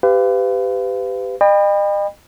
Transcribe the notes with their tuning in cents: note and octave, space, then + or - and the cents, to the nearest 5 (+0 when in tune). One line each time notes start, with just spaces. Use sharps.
G4 +0 B4 +35 F5 -20
D#5 -40 G5 +35 B5 +0